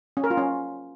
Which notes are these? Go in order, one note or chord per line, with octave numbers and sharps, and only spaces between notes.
C#4
A#4
F4
C#4